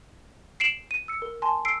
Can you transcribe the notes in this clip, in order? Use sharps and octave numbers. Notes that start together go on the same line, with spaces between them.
C7 D7 E7 F#7
D#7
E6 C#7
A#4
G#5 A5 C6
E6 C7 D7